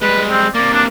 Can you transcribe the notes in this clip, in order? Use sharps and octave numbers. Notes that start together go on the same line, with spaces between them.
G3 G#3 B4
C4
C3 A#3 D5
D4